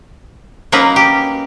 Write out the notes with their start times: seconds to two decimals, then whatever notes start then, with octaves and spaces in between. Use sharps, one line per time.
0.72 F#3 A#3 C#4 D#4 B4
0.96 G4